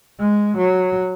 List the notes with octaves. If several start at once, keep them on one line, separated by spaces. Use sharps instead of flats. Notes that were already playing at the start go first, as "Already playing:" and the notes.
G#3
F#3